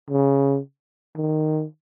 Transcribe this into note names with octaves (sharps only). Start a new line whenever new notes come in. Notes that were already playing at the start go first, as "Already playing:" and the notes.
C#3
D#3